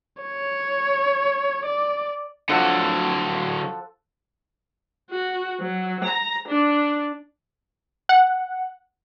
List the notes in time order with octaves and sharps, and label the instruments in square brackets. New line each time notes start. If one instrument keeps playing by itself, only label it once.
[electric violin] C#5
D5
[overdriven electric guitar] D3 F#3 [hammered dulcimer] F3 A4 F#5
[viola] F#4
F#3
A#5
D4
[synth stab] F#5